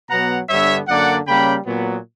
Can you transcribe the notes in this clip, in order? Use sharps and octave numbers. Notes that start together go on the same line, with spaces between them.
B2 F#3 B3 F#5 A#5
G2 D3 G3 B3 C#5 E5
F#2 D3 A#3 D5 F#5
C#3 G3 A#3 C#4 G5 B5
A#2 F#3 B3